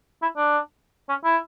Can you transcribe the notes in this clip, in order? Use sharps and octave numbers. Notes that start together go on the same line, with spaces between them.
E4
D4
C#4
E4